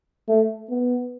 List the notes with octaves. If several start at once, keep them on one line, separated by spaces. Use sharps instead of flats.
A3
B3